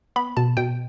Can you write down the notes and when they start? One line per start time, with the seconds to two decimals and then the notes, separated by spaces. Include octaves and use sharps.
0.16 B3 B5
0.37 B2 A5
0.57 B2 G5